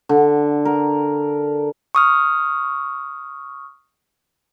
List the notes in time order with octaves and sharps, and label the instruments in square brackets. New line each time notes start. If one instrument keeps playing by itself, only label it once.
[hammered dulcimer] D3
A#4
[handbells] C#6 D#6 F6